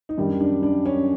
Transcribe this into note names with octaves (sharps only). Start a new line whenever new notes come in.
D#4
F#2 D#3 G3 D4
D4
D4
C#4